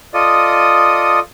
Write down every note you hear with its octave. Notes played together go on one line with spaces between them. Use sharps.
F4 A4 D5 D#5 D#6